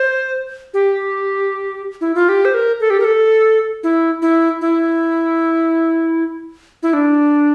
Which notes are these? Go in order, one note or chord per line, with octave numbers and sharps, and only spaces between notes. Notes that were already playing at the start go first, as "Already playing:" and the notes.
Already playing: C5
G4
E4
F4
G4
C5
A#4
A4
G4
A#4
A4
E4
E4
E4
E4
D4